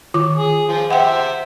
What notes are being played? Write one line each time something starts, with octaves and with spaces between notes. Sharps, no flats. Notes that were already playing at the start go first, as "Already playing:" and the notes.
D#3 F4 D6
G#4
F3 G#4
C5 E5 F#5 G5